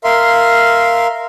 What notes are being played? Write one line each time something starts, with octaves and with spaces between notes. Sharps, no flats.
A#4 E5 F5 C6